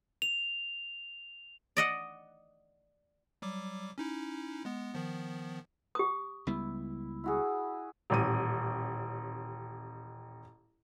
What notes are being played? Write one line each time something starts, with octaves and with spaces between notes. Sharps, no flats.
F7
D5 D#5 F#5
F#3 G3 D6
C#4 D#4 E4
G#3 B3
D#3 F3 B3
G4 D#6
C#2 G3 B3 E4
E4 F#4 G#4
D#1 A1 D#7